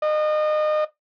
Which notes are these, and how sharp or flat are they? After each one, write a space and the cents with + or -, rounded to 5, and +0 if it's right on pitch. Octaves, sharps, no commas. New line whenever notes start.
D#5 -30